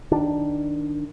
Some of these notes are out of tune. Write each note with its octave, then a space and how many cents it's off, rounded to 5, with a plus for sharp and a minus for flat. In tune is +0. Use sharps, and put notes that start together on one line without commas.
D#3 -5 D4 +0